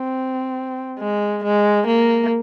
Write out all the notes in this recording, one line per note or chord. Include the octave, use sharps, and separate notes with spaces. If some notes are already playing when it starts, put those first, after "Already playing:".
Already playing: C4
G#3
G#3
A#3